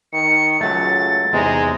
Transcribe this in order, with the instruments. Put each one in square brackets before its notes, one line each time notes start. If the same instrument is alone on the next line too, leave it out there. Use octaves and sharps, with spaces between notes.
[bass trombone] D#3 [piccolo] C#7
[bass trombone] C#2 [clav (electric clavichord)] F#3 A3 [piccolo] A6
[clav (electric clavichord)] E2 C3 D#4 [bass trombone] G#3 [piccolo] A#5